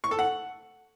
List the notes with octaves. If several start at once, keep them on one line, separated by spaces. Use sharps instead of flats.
C#6
A4
F#5